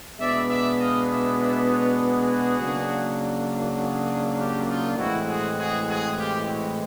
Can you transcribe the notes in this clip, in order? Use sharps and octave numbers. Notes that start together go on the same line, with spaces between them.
B2 G#3 B3 D4 D5 E5
D5 E5
D#5 F5
D5 E5
D5 E5
B4 C#5
F#4 G#4
C#3 F#3 A#3 D4
F#4 G#4
F4 G4
D#4 F4
A2 E3 G#3 C4 E4 F#4
F#4 G#4
F#4 G#4
F#4 G#4
F4 G4
E4 F#4